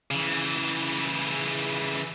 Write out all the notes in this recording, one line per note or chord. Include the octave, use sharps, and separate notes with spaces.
C#3 E3